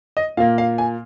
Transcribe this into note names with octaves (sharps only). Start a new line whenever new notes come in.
D#5
A#2 A#3 F5
F5
G#5